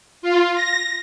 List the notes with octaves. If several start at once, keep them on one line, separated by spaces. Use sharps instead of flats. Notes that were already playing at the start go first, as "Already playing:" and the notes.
F4
A#6